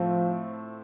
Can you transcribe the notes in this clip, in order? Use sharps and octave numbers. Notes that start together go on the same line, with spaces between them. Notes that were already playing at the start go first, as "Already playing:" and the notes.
Already playing: A2 F3 A3 C4